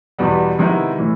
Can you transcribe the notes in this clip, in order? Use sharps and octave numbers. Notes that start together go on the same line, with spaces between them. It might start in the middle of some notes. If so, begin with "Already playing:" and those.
E2 B2 G3 B3
C3 D#3 G#3 B3 E4
A2 E3